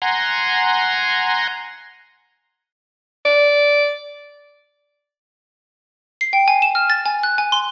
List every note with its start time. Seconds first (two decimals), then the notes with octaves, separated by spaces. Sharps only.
0.02 F#5 G#5 A#5 C6
3.26 D5
6.21 C7
6.33 G5
6.48 G#5
6.62 E7
6.75 F6
6.90 A6
7.06 G#5
7.23 F#6
7.38 G#5
7.52 C6